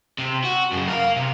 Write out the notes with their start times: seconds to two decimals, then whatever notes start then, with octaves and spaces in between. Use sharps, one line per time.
0.18 C3
0.44 F#4
0.72 F#2 C#3
0.88 A#4 F5
1.16 C3